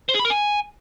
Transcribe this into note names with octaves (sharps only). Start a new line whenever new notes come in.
C5
G#4
B5
A#4
G#5